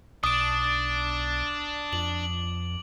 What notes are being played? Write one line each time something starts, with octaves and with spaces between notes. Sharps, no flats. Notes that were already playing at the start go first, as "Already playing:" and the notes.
B1 D4 D6 D#6 D7
F2 F#7